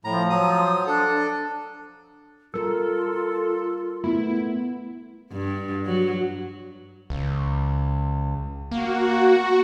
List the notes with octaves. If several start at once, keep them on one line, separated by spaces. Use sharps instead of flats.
A2 F3 A#5
F#3 D#6
D4 A4
G3 F4 A4 A#4
A3 B3 E4
G2
F#3
C#2
A#3 F#4